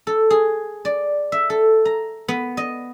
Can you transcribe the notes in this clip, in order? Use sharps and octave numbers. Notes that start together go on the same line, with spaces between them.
A4
G#4
D5
E5
A4
A#5
B3
D#5